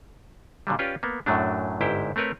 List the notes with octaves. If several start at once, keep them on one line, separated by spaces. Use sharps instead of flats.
A#2 D3 F#3 G3
C#4 F4 G4 B4 D5
A#3 B3
F#2 A2 F#3 A3 D4
G1 G#2 E4 G4 C5 G5
A3 C4 A#4 B4 C#5